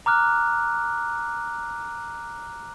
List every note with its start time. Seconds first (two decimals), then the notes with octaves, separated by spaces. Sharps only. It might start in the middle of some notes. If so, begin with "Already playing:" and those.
0.06 A#5 D6 F6 F#6